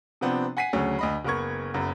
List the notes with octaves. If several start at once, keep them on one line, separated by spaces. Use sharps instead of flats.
C3 F3 B3 C4 D4
F#5 G#5 B6 C7 D#7
D2 C#3 F#3 C#4
D2 D#5 B5
F#1 B3 A#4 C#6 G#6
F#1 F#2 B3